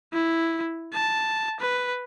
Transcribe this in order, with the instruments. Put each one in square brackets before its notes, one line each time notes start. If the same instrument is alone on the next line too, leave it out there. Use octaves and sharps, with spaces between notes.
[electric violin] E4
A5
B4